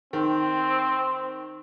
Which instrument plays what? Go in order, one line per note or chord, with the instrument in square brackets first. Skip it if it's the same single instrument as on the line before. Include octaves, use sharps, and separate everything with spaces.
[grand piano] D#3 [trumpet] C4